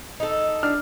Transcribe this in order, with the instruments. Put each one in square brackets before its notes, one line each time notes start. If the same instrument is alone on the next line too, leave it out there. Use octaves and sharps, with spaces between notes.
[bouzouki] D#4 A4
[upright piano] D4 F6